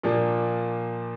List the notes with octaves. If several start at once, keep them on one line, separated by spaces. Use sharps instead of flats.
A#2 F3 A#3 D4